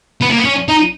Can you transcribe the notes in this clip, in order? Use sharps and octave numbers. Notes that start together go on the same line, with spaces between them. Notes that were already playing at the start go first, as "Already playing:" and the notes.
B3
A#3
B3
C#4
D#4